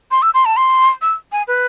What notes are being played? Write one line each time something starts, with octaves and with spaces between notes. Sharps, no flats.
C6
E6
C6
A5
C6
E6
G#5
B4